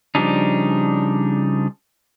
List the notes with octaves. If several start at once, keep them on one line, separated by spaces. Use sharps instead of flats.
C#3 F3 G3 D4 D#4